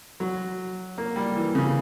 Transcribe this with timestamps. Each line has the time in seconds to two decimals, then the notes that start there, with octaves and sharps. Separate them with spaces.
0.20 F#3
0.98 A#3
1.16 G3
1.36 E3
1.55 C#3